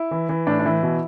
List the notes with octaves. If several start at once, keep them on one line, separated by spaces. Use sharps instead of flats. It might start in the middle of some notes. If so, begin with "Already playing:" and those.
Already playing: E4
E3
E3
A2 D4
D4
E3 E4
B2